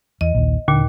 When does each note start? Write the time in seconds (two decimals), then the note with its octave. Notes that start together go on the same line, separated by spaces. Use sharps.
0.21 E2 D#5
0.35 A#1 D#2
0.68 D#2 A#2 D3